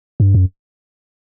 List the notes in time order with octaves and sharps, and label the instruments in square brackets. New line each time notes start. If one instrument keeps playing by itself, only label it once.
[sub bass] G2
F#2